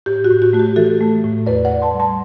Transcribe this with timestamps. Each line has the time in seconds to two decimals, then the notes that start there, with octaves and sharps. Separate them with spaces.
0.06 A2 G4
0.25 F#4
0.30 A2
0.42 F#4
0.53 A3 F#4
0.59 G4
0.76 E3 F#4 A4
1.00 A3
1.24 A2
1.46 E2 B4 D5
1.65 D5 F#5
1.71 E2
1.82 A5 C6
1.94 G3
2.00 A5 C6